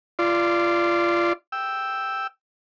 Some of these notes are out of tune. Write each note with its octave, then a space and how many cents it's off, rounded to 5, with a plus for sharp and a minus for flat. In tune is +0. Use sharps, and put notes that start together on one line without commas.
F4 -25 D5 +0 C6 +0
G5 +0 E6 +0